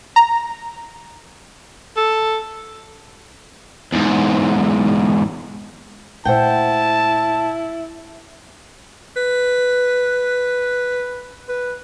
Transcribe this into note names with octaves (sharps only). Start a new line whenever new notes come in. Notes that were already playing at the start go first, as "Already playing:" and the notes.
A#5
A4
E2 G#2
A#2 A3 E4 C5 F#5 G5 A5
B4
B4